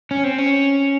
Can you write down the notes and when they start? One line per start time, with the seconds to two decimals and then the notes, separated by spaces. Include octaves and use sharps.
0.11 C#4
0.24 C4
0.38 C#4